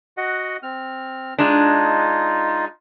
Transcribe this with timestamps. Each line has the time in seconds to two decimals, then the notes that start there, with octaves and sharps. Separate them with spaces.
0.17 F#4 D#5 F#5
0.63 C4 F6
1.39 G#3 D4 D#4 F4